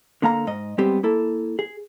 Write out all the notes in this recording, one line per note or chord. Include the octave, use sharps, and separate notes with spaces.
D3 A#3 F5 A#5
G#2 D#5
G3 G#3 B3 C4 G4
A#3 E4 A4
G#4